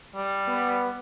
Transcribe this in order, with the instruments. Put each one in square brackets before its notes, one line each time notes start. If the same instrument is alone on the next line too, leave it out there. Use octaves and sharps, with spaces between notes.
[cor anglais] G3
[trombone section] B3 B4